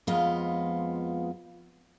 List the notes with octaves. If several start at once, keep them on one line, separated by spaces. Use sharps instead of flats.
F2 F3 G#3 B3 F4 D#5